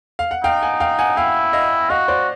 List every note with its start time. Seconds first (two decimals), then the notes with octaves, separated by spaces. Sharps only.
0.19 F5
0.31 F#5
0.43 D#4 F5 G5
0.63 F#5 G#5
0.80 F5 G5
0.99 F#5 G#5
1.17 E4 F5 G5
1.53 D#5 F5
1.90 F#4 D#5 F5
2.08 C5 D5